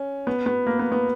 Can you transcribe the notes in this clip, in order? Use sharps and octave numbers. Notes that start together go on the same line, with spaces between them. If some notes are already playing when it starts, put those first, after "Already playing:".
Already playing: C#4
B3
B3
A#3
B3
B3